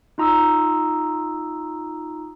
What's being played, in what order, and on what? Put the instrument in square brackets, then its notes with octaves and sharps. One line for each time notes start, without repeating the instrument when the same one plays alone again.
[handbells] D#4 F4 A#5 D#6 E6